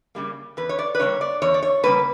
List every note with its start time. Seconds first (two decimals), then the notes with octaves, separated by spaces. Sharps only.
0.15 C#3 G3 A#3
0.57 E2 B4
0.69 C#5
0.79 D5
0.95 B4
1.00 C#3 G3 A#3 C#5
1.21 D5
1.42 E2 C#5
1.54 D5
1.63 C#5
1.83 C#3 G3 A#3 B4